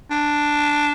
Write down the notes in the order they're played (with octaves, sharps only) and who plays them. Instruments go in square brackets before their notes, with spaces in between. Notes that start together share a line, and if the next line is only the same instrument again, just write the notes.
[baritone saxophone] D4